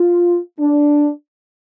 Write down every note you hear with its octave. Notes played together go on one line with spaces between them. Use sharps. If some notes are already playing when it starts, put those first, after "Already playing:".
Already playing: F4
D4